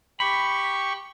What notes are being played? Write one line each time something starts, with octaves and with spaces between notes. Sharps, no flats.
G4 B5 C#6